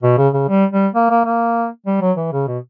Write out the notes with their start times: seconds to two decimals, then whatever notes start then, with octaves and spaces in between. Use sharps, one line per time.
0.03 B2
0.18 C#3
0.34 C#3
0.49 G3
0.72 G3
0.95 A#3
1.10 A#3
1.25 A#3
1.86 G3
2.01 F#3
2.17 E3
2.32 C#3
2.47 B2